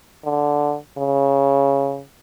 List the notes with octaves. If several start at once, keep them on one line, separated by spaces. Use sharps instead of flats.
D3
C#3